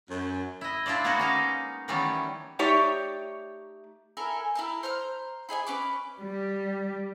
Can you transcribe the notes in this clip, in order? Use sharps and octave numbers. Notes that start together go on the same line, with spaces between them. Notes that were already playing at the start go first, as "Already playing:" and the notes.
F#2
E4 D#5
D4 E4 F4 C5 D5
G#3 A#3 B3 D#4 E4 F#4
C#4 D#4 F5
D#3 E3 G3 A3 B3 C#4
A3 D#4 G4 C#5 D5 E5
E4 A4 A#4 G#5
E4 A#4 A5
C5 A#5 F6
E4 G#4 D#5 G#5
C#4 B4 D6
G3